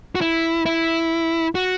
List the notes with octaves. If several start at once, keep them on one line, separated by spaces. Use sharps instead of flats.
F#4
E4
E4
F#4